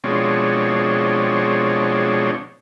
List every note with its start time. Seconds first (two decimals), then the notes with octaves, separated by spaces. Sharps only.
0.04 B2 F3 G#3 C4 D4 C#5